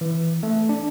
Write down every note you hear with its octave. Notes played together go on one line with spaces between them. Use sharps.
E3
A3
D4